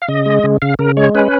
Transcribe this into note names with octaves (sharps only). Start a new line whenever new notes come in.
F5
C#3 D#5
G#3
C#3
C#3 F5
C#3 A#4
G#3 C#5
C#4 B4